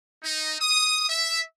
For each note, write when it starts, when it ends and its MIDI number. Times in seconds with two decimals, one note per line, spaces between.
0.23 0.54 63
0.61 1.09 87
1.09 1.40 76